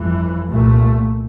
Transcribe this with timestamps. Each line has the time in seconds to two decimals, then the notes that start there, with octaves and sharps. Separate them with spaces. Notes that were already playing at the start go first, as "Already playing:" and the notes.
Already playing: G1 F2 E3
0.48 C2 A#2 A3